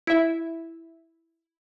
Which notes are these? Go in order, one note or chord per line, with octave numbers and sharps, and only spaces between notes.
E4 E5